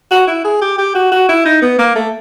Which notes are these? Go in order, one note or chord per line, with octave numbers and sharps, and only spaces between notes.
F#4
E4
G#4
G4
G4
F#4
F#4
E4
D#4
B3
A#3
A3